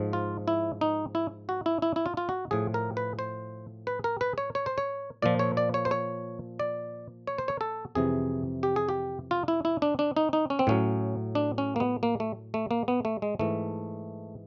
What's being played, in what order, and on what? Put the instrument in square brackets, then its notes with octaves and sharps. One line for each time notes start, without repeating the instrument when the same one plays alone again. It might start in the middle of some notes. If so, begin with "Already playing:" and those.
Already playing: [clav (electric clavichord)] G#2 F3
F4
E4
D#4
E4
F#4
E4
E4
E4
F4
F4
F#4
A2 F3 G#4
A#4
B4
C5
B4
A#4
B4
C#5
C#5
C5
C#5
A#2 F3 D5
C#5
D5
C#5
C5
C#5
D5
C#5
C5
C#5
A4
F2 C3 E3 G#4
G4
G#4
G4
F4
E4
E4
D4
D4
D#4
D#4
C#4
C4
A2 F#3 C#4
D4
C#4
A#3
B3
A#3
A3
A3
A#3
B3
A3
G#3
G#2 E3 A3